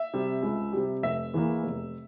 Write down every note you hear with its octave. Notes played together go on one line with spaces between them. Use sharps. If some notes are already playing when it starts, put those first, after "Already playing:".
Already playing: E5
C3 G3
C#2
C3 G3
F1 E5
E2 E3 A#3
F1